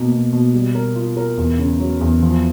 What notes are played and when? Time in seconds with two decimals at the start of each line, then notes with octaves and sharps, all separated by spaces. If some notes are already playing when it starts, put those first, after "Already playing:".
Already playing: B2 A#3
0.11 B2
0.32 B2
0.54 G3
0.75 A#4
0.96 F4
1.17 A#4
1.37 E2
1.59 C#3
1.79 F#3
2.01 E2
2.22 F3